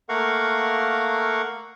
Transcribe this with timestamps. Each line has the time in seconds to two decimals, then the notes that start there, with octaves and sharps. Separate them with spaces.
0.09 A3 A#3 A#4 F5 F#5 C#6